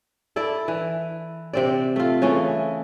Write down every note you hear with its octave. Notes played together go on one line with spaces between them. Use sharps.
E4 A4 D5
E3
C3 C4 D5
A3 F4
C#3 E3 A3 C#4